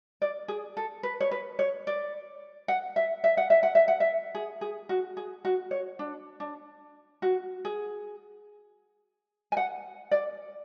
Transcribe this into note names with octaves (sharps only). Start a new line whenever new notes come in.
D5
G#4
A4
B4
C#5
B4
C#5
D5
F#5
E5
E5
F#5
E5
F#5
E5
F#5
E5
G#4
G#4
F#4
G#4
F#4
C#5
D4
D4
F#4
G#4
G#5
F#5
D5